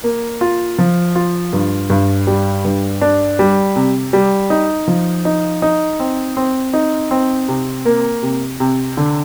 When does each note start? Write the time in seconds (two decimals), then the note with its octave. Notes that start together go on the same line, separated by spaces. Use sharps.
0.04 A#3
0.41 F4
0.78 F3
1.15 F4
1.53 G2
1.90 G2
2.27 G3
2.64 G2
3.01 D4
3.39 G3
3.76 C3
4.13 G3
4.50 D#4
4.88 F3
5.25 D#4
5.62 D#4
6.00 C4
6.37 C4
6.73 D#4
7.11 C4
7.48 C3
7.85 A#3
8.23 C3
8.60 C3
8.97 D3